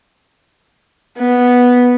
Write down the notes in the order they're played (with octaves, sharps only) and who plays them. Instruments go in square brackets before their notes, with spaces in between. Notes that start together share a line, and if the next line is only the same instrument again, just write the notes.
[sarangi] B3